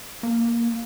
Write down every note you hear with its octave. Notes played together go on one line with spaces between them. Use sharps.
A#3